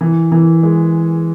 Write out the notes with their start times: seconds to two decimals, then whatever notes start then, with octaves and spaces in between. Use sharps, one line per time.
0.01 E3
0.32 E3
0.63 G#3